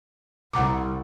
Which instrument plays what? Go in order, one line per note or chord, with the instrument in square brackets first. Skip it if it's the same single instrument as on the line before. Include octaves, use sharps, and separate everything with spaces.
[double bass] C2 [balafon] F#5 A#5 D6